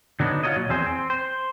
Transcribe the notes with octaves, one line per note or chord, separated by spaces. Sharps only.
D3 F#3 B3 D4 D#4
F4 F#4 A#4 C#5 D#5
A#2 F#3
E2 C4 G#4 C5
C4
C5